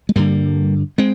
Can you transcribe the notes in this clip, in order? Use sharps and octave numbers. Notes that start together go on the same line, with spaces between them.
G#3
G2 D3 G3 A#3
G#3 C4